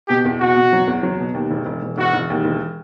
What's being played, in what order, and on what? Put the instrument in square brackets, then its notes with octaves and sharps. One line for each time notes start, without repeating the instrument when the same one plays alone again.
[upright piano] B2 [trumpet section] G4
[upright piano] E2
[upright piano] B2 [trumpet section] F#4
[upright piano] B2
F#3
E2
F#3
B2
D#2
E1
E1
E1
[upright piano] E1 [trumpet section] F#4
[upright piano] E1
D#2
E1